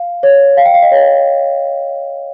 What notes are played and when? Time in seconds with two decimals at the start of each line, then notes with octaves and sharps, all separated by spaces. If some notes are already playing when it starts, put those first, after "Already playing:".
Already playing: F5
0.23 C#5
0.57 F5
0.65 G5
0.74 F5
0.82 D#5
0.92 C#5